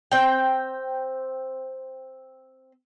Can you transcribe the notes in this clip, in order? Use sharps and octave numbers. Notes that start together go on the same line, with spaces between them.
C4 G5